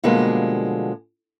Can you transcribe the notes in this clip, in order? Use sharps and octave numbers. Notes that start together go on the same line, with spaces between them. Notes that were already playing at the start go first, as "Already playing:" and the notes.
B2 D3 F3 G3 G#3 A#3